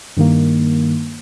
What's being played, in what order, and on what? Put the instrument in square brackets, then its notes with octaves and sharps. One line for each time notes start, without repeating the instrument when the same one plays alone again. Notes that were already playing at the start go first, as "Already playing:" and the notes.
[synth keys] G2 D#3 A#3